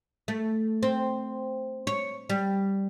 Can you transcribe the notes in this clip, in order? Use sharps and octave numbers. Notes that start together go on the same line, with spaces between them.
A3
C4
C#5
G3